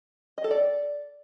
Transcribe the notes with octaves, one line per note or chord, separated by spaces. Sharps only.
D#5
A4
D5